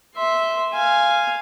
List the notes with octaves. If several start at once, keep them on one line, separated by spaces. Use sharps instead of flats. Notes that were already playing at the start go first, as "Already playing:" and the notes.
E5 C6
F5 G#5